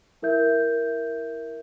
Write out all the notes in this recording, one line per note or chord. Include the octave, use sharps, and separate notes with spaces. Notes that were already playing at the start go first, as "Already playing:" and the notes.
E4 A#4 E5 G6